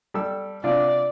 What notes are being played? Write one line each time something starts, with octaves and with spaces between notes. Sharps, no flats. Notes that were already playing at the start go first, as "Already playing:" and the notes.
G3 A4 E6
C3 D4 F4 D5